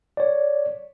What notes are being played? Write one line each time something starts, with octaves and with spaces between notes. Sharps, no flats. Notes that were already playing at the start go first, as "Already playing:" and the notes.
C#5 D5